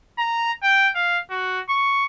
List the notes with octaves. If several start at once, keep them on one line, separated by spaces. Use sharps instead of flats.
A#5
G5
F5
F#4
C#6